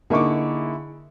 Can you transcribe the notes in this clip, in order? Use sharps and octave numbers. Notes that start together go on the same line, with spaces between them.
D3 A#3 D#4 E4 G#4 C#6 D6